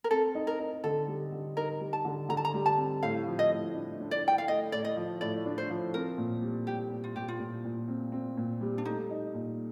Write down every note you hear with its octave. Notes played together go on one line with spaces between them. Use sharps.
A#4
C4 A4
D#4
A#4
D#4
D3 A4
G3
D3
D#4 A#4
G3
A5
D3
D3 A#5
A5
A#5
G3
A5
C4
A2 F5
F3
D#5
A2
D4
D4
D5
A3 G5
F5
A3 D#5
A2 D5
D#5
F3
A2 D5
D4
C5
F3
C4 A#4
A#2
G3
G3 G4
A#2
F4
A#2 G4
F4
A#2
A#2
C4
C4
A#2
G3
D4
A3 D#4
D#4
A#2